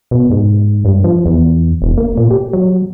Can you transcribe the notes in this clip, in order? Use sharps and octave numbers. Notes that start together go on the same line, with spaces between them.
B2
G#2
G2
F3
E2
E1
A#3
A#2
G4
F#3